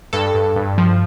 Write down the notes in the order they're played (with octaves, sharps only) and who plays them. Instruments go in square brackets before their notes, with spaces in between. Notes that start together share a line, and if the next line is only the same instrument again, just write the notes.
[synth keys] G2 A4
G2
G2
F3